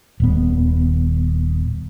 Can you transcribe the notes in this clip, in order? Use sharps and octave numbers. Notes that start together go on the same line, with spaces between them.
D#1 B3